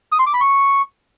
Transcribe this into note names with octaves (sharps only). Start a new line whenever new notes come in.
D#6
C6
D6
B5
C#6